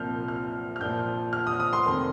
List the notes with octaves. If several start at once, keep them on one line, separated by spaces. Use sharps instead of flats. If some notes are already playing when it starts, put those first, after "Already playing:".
Already playing: C2 A#2 F3 F6 G6
F6
F6
A#1 A#2 F3 G6
F6
D#6
D#6
C6
F1 F2 D#3